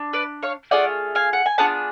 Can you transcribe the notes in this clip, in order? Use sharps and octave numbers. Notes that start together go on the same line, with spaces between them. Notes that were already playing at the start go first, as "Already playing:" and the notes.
Already playing: D4
B4 D5
C#5 F5
A3 F4 G#4 D5 F#5
F5 G#5
F#5
G#5
B3 D4 F4 G#4 F#5 A5